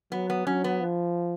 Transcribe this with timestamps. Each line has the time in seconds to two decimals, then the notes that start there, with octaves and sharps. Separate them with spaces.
0.12 F#3 B3
0.30 B3
0.47 F#3 C#4
0.64 B3
0.81 F3